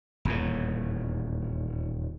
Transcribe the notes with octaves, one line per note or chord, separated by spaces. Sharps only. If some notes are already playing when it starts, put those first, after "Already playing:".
D#1 E2 A2